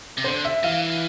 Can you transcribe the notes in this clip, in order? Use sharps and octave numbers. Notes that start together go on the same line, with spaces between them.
C3
D3 C5
E5
E3 F5